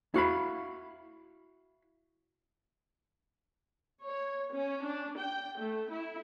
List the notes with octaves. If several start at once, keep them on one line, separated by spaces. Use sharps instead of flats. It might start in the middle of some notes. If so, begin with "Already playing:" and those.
E4 F#4 F5 B5
C#5
C#4
D4
G5
A3
E4